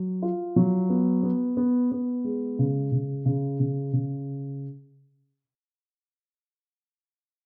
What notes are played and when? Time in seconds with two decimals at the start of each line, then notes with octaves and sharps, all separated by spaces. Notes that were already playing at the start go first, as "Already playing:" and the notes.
Already playing: F#3
0.22 F4
0.56 F#3
0.90 B3
1.23 B3
1.57 B3
1.92 B3
2.24 G#3
2.59 C#3
2.92 C#3
3.26 C#3
3.60 C#3
3.93 C#3